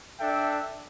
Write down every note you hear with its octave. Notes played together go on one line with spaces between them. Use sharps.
D4 A4 E5 G5